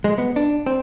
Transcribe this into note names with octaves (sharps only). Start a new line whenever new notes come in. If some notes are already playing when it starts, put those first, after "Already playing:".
G#3
B3
D4
C4